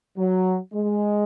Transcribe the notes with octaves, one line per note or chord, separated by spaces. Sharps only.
F#3
G#3